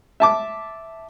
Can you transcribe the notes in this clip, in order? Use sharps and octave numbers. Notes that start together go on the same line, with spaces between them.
E5 A5 D6